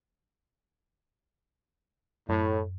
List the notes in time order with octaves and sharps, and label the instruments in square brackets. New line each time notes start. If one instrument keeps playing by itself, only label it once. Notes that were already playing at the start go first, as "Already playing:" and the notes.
[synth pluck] F#2 [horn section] A2